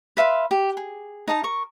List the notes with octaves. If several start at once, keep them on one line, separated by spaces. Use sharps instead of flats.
B4 E5 F5 C6
G4
G#4
D#4 D#5 A5 A#5
A#4 C#6